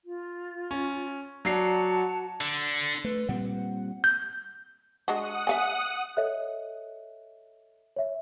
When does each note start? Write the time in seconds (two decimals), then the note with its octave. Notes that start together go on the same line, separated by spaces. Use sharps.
0.03 F4
0.71 C#4
1.45 F#3 F#4 D5 F#5 A5 C7
2.41 D3
3.05 A3 B4
3.29 A#2 G3 C4 F#5
4.04 G6
5.08 G#3 D4 F#4 F#5 D#6
5.47 E5 F5 G#5
6.17 A4 C#5 D#5 E5 F#6
7.96 C#5 E5